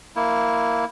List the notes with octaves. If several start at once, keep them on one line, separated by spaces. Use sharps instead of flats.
A#3 E4